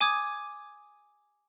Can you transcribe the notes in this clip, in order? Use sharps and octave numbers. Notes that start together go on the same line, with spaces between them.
G#5 D6 D#6 G#6